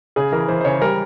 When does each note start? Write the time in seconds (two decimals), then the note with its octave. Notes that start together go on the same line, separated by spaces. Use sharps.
0.16 C#3 G#4
0.32 E3 A#4
0.48 E3 C5
0.61 C5
0.65 C#3 C#5
0.81 G3 A#4